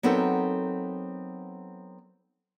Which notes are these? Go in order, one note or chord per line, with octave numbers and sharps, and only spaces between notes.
F#3 B3 C4 D#4 A4 A#4